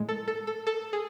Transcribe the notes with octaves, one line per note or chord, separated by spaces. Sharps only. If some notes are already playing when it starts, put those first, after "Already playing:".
Already playing: A2 G#3
A4
A4
A4
A4
G#4